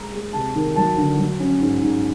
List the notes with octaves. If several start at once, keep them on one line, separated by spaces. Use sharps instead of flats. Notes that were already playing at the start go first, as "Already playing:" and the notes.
Already playing: G#3 A#5
G#3
C3 A5
D#3
F#3 A5
D3
F#3
C#4
G#2
G#2